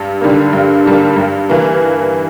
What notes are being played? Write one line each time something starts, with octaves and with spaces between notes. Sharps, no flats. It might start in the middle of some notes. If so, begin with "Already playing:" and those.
Already playing: G2
D3 G3 A#3
G2
D3 G3 A#3
G2
E3 A#3